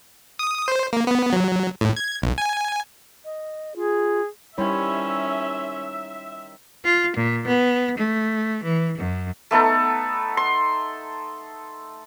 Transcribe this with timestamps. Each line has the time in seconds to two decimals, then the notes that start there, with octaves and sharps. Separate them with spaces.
0.39 D#6
0.68 C5
0.93 A#3
1.07 B3
1.33 F#3
1.81 A2
1.96 G#6
2.22 B1
2.38 G#5
3.25 D#5
3.76 F4 G#4
4.58 D#3 G3 C#4 E4 C5 C#5 E5 B5
6.85 F4
7.16 A#2
7.47 B3
7.98 A3
8.63 E3
8.98 F#2
9.51 A3 B3 D#4 A4
10.37 C6